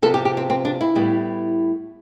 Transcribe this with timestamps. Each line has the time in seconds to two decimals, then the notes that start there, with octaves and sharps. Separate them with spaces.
0.02 C3 F3 B3 A4
0.14 G4
0.25 G4
0.37 C4
0.50 C4
0.65 D4
0.81 E4
0.95 A2 G3 B3